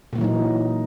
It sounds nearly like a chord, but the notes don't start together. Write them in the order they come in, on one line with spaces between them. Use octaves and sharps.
A#2 A#3 E3 F#3 D#4